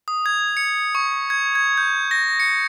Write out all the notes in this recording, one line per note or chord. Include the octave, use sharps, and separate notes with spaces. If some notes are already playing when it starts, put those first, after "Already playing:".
D#6
G#6
C#7
C#6
G#6
G#6
G6
A#6
C#7